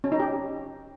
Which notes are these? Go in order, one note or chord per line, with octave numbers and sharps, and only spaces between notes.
C#4
D#4
G4